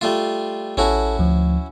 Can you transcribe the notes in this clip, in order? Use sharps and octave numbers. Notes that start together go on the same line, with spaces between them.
G3 A3 F4
A1 C#4 E4 F#4 A4 A5
D2 F3